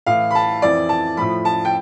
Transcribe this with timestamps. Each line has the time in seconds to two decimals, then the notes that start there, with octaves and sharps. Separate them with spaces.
0.06 A2 E3 F5
0.31 B5
0.35 A5
0.62 F2 E3 D5
0.89 A5
1.17 A2 F3 B5
1.45 A5
1.65 G5